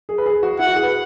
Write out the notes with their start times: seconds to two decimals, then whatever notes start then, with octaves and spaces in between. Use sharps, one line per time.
0.09 G#4
0.18 B4
0.26 G#4
0.43 F#4
0.59 E4 F#5
0.67 F#4
0.75 G#4
0.83 B4